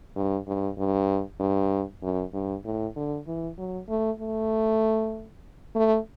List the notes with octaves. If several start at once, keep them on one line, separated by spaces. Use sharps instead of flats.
G2
G2
G2
G2
F#2
G2
A2
D3
E3
F#3
A3
A3
A3